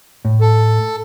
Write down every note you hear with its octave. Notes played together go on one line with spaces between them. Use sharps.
A2
A4